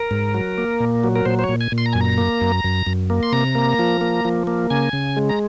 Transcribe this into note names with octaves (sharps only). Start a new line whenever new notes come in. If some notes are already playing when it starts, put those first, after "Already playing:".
Already playing: A#4
G#2
F#3
A#3
A#2
F#3
A#4
A#2 C5
C5
C#5
A#2
G#5
A#2
C6
A#5
F#2 G#5
A#5
A#3
F#2
F#2
F#2
A#3
C6
C3 A#5
A#3
F3
A#3
F3
A#3
C#3 G#5
C#3
G#3
A#5